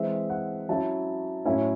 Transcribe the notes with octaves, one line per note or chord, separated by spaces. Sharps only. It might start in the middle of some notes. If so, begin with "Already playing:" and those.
Already playing: E3 G#3 C4 E5
F#5
F#3 C#4 E4 A5
A2 F#3 C#4 E4 G#5